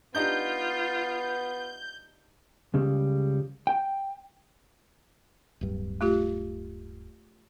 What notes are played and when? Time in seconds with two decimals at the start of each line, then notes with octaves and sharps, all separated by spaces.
0.15 B3 D4 D#4 F4 G4 G6
2.74 C#2 C#3 G3
3.67 G5
5.61 D1 G2
6.01 A3 F4 G4